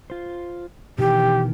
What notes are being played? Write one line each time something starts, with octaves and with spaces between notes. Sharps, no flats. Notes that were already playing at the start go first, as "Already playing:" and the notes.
F4 C5
B2 D#3 E3 G4